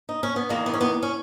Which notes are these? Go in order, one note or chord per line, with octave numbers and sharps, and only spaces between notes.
D#4
C#4
B3
E2 D#3 G#3 A#3
B3
C#4
B3
C#4